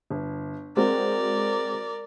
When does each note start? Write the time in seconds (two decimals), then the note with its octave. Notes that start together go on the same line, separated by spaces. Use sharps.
0.10 G1
0.77 G#3 C4 F#4 A#4 D5